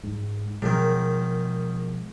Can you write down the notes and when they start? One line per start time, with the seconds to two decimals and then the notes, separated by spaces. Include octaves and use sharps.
0.03 G#2
0.62 F#2 B2 D#3 F3 G#3